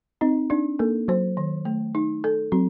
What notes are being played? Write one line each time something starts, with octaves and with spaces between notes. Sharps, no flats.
C4 D#4
D4 D#4
A#3 A4
F#3 C5
D#3
A3
D#4
A4
F#3 C4